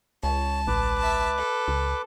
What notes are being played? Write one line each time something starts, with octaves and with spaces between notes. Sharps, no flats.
C#2 C#5 A5
A1 B4 D6
E5 A5
A4
C#2